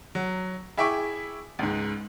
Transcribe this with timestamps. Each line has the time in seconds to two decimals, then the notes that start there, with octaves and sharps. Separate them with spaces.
0.15 F#3
0.77 E4 G#4 E5 G5 C#6 D6
1.59 C#2 G#2